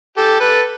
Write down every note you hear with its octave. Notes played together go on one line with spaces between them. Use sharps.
G4 A4
A4 B4